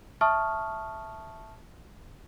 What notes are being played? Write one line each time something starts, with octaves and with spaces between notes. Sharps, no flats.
E5 A5 C#6 D#6 F6